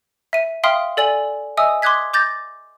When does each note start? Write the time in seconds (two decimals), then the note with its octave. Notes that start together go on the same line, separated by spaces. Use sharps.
0.33 E5 D#7
0.63 E5 F5 G5 C6 D#6 F6
0.97 A4 D5 G#5 F#7
1.57 D#5 E5 G#5 D#6 E6
1.82 C6 D6 D#6 F#6 G#6 B6
2.14 D6 G6 A6 A#6